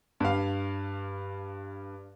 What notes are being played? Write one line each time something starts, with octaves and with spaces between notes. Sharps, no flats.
G2 F5